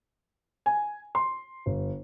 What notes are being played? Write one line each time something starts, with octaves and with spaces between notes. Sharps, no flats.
G#5
C6
G1